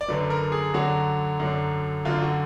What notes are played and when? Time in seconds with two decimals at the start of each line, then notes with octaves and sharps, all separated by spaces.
0.01 D5
0.08 F#2 D3 F#3 B4
0.30 A#4
0.52 G#4
0.73 F#2 D3 F#3 F#4
1.40 F#2 D3 F#3
2.05 F#2 D3 F#3 F4
2.22 F#4